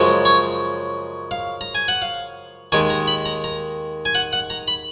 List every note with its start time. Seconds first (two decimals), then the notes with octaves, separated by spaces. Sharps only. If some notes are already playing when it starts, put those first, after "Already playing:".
Already playing: F#2 C#3 F3 G#3
0.25 C#5
1.31 F5
1.61 A#5
1.75 G#5
1.88 F#5
2.02 F5
2.72 D#2 D#3 G#3 G#5
2.90 A#5
3.07 B5
3.26 A#5
3.44 A#5
4.05 G#5
4.15 F#5
4.33 F#5
4.50 A#5
4.68 B5